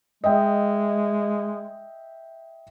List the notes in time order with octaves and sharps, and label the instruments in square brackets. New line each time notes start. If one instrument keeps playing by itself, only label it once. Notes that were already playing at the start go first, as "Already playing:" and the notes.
[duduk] G#3 [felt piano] D#5 E5 G5